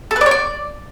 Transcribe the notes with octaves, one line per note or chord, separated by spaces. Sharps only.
A4
B4
D5
C#5
D5